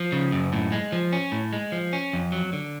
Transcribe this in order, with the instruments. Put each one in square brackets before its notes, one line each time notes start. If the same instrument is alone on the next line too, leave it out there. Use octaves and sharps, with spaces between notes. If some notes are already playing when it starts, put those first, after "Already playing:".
Already playing: [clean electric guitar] F3
C#3
F#2
A2
G#3
F3
C#4
A2
G#3
F3
C#4
F2
F#3
D3